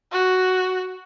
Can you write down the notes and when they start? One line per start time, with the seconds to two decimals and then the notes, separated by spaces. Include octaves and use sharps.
0.12 F#4